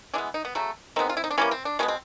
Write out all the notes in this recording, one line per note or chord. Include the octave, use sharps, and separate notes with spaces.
E3 G#3 B3 D4
D#4
B3
C#3 F#3 A3
D#3 G#3 B3 C4
F4
E4
D#4
D4
E3 G3 A#3 C#4
C4
D4
B2 G#3 B3 C#4
C4